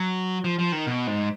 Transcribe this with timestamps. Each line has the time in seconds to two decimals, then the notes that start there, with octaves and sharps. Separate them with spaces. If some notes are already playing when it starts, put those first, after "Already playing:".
Already playing: F#3
0.44 F3
0.59 F3
0.72 D#3
0.87 B2
1.07 G#2